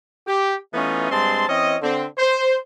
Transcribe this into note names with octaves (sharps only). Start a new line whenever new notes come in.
G4
E3 A3 B3 C#4 D#4 F4
G2 G#3 C4 A5 C6
E3 C4 C#4 D#5
D3 C4
C5